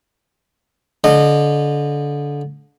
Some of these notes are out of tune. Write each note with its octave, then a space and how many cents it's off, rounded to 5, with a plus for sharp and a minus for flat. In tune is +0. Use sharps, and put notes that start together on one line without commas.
D3 -25 D#5 -25